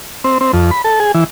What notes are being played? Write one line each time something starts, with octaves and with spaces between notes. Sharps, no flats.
C4
C4
F2
B5
A4
G#4
E3